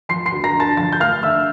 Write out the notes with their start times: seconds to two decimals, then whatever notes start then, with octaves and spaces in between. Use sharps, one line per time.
0.09 F3 C6 C7
0.26 C6 C7
0.32 D2
0.44 A#5 A#6
0.54 D3
0.60 A5 A6
0.77 F3 A5 A6
0.93 G6
1.00 A3 F5 F6
1.23 D3 E5 E6